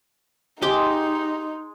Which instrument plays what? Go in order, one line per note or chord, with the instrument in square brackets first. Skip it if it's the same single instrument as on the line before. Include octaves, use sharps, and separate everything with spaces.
[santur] G#3 [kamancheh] D#4 [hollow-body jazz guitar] G4